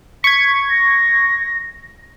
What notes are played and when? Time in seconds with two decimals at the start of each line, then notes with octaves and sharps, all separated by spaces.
0.24 C#6 G#6 B6
0.70 A#6